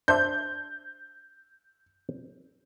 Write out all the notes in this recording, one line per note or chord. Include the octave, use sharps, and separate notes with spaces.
D4 C5 E5 G6